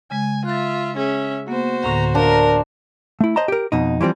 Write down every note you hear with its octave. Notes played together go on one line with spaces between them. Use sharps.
C#3 G#3 G#5
F4 E5 F#6 A6
C#4 G#4 E5
A#3 B3 F#4 C5
D2 A2 D3 A#5
D4 A#4 F5
A3 E4
C5 D#5 A5 A#5
G4 A#4
F2 B2 D#4
E3 F3 G3 C4